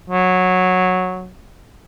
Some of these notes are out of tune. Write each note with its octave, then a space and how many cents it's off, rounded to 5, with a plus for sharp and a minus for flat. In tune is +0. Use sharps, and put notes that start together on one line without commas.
F#3 -10